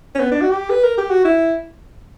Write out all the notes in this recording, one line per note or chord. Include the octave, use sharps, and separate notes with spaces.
C#4
B3
D4
F#4
G4
B4
A#4
G4
F#4
E4